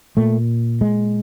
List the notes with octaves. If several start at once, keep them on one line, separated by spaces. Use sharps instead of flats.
A#2 A3
G#3